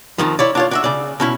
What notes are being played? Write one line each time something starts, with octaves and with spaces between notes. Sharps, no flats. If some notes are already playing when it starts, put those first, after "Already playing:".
F2 A2 D#3 F3
E4 C#5 D5
D4 F4 C#5
D4 F#4 E5
C#3 D5
B2 C#4 E4